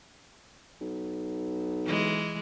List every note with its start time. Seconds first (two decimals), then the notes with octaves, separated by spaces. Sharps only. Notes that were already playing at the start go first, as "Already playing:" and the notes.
0.81 B1
1.86 E3 G#3